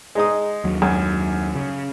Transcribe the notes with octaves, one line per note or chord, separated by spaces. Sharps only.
G#3 D#4 D#6
D#2 F#3
F#2
C#3